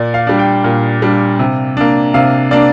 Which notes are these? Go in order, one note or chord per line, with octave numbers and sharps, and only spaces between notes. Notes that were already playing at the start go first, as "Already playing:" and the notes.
Already playing: A#2 D5
F5
G3 D4
G5
A#2
G3 D4
C3
A#3 D4
C3 F5
A#3 D4 D5